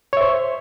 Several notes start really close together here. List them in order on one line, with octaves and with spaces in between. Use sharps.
C#5 E5 C5